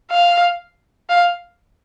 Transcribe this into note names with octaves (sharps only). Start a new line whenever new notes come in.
F5
F5